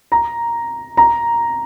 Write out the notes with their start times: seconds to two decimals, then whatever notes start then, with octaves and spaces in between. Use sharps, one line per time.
0.12 A#5
0.97 A#5